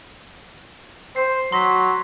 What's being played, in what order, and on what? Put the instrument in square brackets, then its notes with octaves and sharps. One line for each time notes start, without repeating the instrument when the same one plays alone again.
[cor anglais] C5 [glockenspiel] C7
[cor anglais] F#3 [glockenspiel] C6 A#6 B6